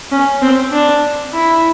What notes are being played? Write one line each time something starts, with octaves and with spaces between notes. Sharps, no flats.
C#4
C4
D4
E4